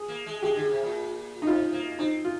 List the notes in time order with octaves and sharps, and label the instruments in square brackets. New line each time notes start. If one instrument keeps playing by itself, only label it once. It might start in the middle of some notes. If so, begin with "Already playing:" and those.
Already playing: [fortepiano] G#4
[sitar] A#3
G#3
[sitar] G#3 [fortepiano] G4
[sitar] D3
C3
A#2
[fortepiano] D#4
[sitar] C3 [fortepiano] F4
[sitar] A#3
[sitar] C4 [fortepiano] D#4
[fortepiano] F4